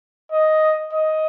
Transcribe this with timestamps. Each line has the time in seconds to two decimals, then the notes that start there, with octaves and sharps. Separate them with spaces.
0.32 D#5
0.93 D#5